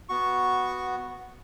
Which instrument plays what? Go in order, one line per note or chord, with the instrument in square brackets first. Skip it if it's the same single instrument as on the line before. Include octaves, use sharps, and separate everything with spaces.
[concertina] B3 F#4 C#6